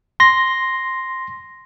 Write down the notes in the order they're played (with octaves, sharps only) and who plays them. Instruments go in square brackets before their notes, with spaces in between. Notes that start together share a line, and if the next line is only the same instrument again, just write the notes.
[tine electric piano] C6 A#6